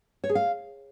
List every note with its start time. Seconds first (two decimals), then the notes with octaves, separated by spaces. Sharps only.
0.24 C#5
0.29 G#4
0.35 F5